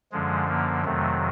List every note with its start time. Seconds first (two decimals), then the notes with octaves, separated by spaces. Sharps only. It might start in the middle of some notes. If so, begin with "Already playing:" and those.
0.12 F#2 D3 F3 G#3
0.48 A#3
0.85 F2 C3 D#3 F#3 A3